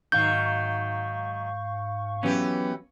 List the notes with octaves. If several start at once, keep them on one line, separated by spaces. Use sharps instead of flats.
G#2 D#3 F#3 F5 C#6 G6
E3 F#3 B3 C#4 G4